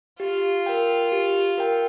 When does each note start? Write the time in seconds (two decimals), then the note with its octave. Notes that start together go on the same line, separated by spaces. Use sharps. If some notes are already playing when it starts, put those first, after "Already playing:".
0.20 F4 G4
0.66 A#4 G5
1.12 G4
1.58 A#4 G5